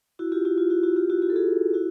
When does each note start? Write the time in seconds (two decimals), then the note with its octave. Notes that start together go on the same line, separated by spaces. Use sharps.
0.19 E4 F#4
0.32 F4 G4
0.45 E4 F#4
0.58 F4
0.70 E4 F#4
0.83 E4 F#4
0.96 F4 G4
1.10 E4 F#4
1.22 F4 G4
1.30 A4
1.36 F#4 G#4
1.73 E4 F#4